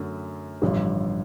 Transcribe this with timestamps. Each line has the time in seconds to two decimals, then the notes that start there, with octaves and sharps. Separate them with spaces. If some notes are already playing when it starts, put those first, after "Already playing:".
Already playing: F#2 D3 F#3 A3
0.62 A1 G2 D3 F3 A3